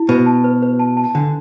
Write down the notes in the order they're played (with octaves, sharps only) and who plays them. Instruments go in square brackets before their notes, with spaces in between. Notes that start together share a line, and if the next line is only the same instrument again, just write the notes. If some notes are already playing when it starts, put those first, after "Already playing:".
Already playing: [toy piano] E4
[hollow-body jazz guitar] B2 [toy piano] B4
[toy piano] A5
B4
B4
A5
A5
[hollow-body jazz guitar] D3 [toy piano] D4